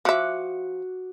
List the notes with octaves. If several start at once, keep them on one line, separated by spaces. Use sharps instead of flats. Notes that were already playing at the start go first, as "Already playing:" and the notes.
F3 F#4 E5 D6 F#6